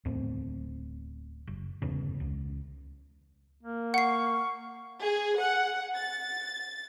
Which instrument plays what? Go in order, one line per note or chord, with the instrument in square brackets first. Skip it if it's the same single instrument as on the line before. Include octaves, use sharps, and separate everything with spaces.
[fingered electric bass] D1 E2 A2 C4
F#1
G1 E2 C#3
C#2
[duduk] A#3
[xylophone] F#5 C7 [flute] C#6
[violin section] G#4
F#5
A6